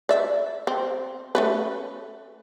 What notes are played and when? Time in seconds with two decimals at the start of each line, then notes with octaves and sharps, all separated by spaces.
0.09 D5 E5
0.67 C4
1.35 A3 C#4 B4